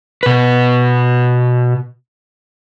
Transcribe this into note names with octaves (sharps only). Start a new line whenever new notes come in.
B2 B4